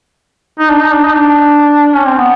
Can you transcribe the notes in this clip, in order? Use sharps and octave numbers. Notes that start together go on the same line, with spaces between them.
D#4
D4
D#4
D4
D#4
D4
C#4
C4
B3